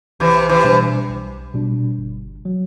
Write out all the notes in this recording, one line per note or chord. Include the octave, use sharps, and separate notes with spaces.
B1 C3 E3
C3 E3
B2 G3 D4
B1
B2 G3 D4
G1
F#3